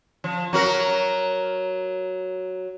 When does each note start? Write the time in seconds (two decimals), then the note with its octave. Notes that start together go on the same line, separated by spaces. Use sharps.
0.24 F3
0.53 F#3 F#4 A#4